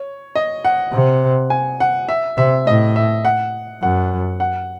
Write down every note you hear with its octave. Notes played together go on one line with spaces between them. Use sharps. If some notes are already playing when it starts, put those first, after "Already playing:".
Already playing: C#5
D#5
F#5
C3
G#5
F#5
E5
C3 E5
A2 D#5
E5
F#5
F#2 F#5
F#5